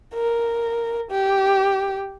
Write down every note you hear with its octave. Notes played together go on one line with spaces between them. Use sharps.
A#4
G4